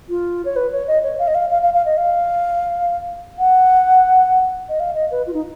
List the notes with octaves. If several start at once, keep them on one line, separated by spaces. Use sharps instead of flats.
F4
C#5
B4
C#5
D#5
C#5
F5
D#5
F5
F5
F5
F5
D#5
F5
F#5
D#5
F5
D#5
B4
F4
D#4